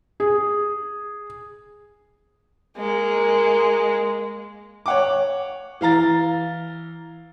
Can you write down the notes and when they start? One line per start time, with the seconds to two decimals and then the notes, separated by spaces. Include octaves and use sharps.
0.20 G#4
2.77 G#3 A#3
4.86 C#5 F#5 D6
5.81 E3 F5 A#5 A6